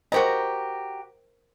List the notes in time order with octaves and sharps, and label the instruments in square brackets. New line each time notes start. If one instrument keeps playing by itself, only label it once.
[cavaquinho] F#4 G4 A#5 [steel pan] A#4 C5 D#5